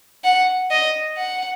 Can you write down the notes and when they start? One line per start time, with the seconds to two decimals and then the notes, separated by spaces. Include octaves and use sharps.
0.24 F#5
0.71 D#5
1.17 F#5